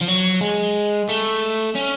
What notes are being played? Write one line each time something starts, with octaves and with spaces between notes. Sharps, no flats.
F3
F#3
G#3
A3
C#4